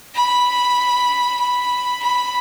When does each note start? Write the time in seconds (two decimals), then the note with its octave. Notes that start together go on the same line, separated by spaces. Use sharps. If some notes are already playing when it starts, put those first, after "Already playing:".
0.15 B5
1.40 B5
2.03 B5